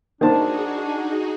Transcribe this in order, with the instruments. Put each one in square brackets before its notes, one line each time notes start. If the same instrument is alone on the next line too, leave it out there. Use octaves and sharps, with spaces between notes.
[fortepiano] D#3 C5 A5 [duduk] D4 [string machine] D#4 F#4 G#4